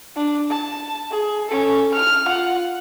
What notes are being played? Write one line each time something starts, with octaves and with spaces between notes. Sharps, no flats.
D4
A5
G#4
C#4 A4
F6
F4 F#5